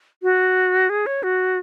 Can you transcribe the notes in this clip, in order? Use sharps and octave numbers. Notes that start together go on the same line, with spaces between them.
F#4
G#4
C#5
F#4